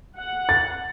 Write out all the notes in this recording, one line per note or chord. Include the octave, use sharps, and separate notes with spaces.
F#5
A6